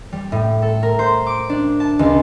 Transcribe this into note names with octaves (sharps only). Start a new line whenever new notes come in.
G3
A2
A4
A#4
C5
D6
D4
A5
C#2